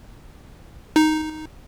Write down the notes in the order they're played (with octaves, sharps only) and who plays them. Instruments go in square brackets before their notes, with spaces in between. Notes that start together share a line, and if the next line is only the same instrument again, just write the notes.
[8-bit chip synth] D#4